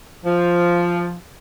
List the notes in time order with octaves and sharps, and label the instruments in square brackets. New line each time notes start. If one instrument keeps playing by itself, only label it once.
[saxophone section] F3